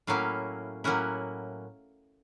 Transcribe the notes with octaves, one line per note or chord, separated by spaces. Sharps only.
A2 F#3 A#3 C#4 E4 F5
A2 F#3 A#3 C#4 E4 F#5